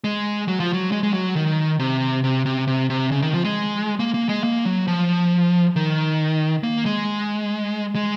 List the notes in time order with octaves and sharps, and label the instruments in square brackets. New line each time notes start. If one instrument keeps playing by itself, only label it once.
[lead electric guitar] G#3
F#3
F3
F#3
G#3
G#3
F#3
D#3
C3
C3
C3
C3
C3
C#3
D#3
F3
G#3
A#3
A#3
G#3
A#3
F#3
F3
D#3
A#3
G#3
G#3